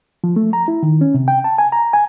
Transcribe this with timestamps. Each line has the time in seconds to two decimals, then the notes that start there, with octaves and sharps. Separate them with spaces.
0.24 F3
0.36 A3
0.53 A#5
0.68 E4
0.83 D#3
1.01 C#4
1.14 C3
1.28 G5
1.44 A5
1.58 G#5
1.72 A#5
1.93 G#5